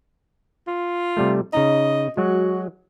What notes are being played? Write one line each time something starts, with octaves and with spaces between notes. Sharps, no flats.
F4
C3 G3 A3
C#3 D#4 D#5 A#5
F#3 G#3 F#4